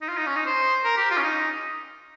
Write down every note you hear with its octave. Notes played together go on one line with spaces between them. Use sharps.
D#4
F4
D#4
C#4
D#4
C5
A#4
G4
F4
C#4
D#4